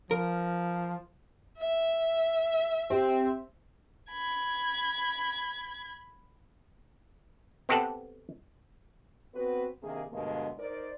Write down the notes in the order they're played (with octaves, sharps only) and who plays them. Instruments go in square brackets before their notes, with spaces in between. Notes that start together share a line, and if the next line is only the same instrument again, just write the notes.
[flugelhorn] F3 [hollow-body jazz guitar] A#4
[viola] E5
[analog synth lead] C4 [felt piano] G4
[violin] B5 G#6
[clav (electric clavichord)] B3 C4 G4 A4 F#5 A5
[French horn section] B3 C4 F#4 B4
C3 D#3 A#3 D4 G#4
G2 B2 D3 G#3 A#3
D#4 A#4 C5 D5